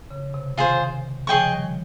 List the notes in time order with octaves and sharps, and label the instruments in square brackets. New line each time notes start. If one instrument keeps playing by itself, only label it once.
[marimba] C#3
C3
[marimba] C3 D#3 [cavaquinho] F4 G#4 C5
[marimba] C#3 F3 [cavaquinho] G#4 D#5 G5 C#6
[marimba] D#3 G3